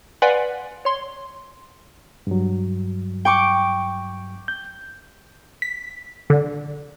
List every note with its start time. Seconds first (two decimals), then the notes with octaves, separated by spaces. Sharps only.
0.22 B4 D5 F5 F#5 G#5 C6
0.85 C#5 C6
2.27 G2 F#3
3.25 G5 C#6 D6
4.48 G6
5.62 B6
6.30 D3